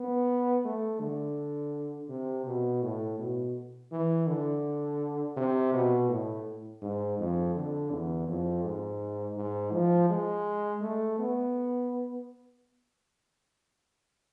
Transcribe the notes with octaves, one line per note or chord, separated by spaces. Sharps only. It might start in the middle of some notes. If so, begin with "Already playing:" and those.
Already playing: B3
A3
D3
C3
B2
A2
B2
E3
D3
C3
B2
A2
G#2
F2
D3
E2
F2
G#2
G#2
F3
G#3
A3
B3